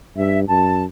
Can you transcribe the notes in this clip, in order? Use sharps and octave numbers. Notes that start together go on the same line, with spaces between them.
G2 E5
F#2 A5